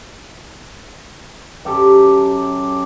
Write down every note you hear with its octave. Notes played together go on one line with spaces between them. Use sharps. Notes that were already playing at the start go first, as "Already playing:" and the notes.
F#2 G4 A4 D6